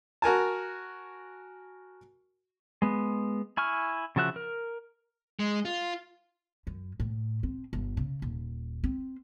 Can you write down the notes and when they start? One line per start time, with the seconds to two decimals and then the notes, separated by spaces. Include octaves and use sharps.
0.22 F#4 A#4 G#5 A5
2.82 G#3 B3
3.57 E4 G#5 C#6 F6
4.16 C#3 F3 F#4 E5 F#6
4.36 A#4
5.39 G#3
5.65 F4
6.67 F#2
7.00 A2
7.43 C4
7.73 G1
7.97 C#3
8.22 D#1
8.84 C4